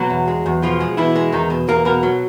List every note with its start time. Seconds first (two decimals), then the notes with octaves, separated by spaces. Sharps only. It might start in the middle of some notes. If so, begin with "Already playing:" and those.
Already playing: B2 F#3 F#4
0.10 E2
0.28 G#3
0.46 E2
0.62 B2 F3 F4
0.80 G#3
0.97 B2 E3 E4
1.16 G#3
1.32 E2 D#3 D#4
1.50 B2
1.68 E2 A#3 A#4
1.85 B2 A#3 A#4
2.03 F#3